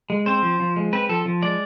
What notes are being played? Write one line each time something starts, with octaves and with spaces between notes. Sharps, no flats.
G#3
C4 C5
F3
F3
G#3
C4 B4
F3 A4
F3
G#3 D5